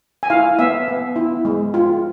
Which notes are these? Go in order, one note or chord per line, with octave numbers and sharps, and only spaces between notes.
G#5
E4 F5
B3 E5
B3
E4
G#3
F4